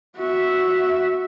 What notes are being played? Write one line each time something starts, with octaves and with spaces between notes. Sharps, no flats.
F#4 E5